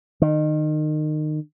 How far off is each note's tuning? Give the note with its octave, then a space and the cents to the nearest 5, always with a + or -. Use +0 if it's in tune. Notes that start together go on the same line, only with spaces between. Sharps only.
D#3 -25